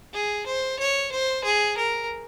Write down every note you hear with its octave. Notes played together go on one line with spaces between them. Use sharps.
G#4
C5
C#5
C5
G#4
A#4